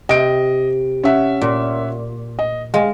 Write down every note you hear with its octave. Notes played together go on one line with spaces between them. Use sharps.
C3 D#5 D7
C#4 E5 F#5
A#2
D#5
G#3 F5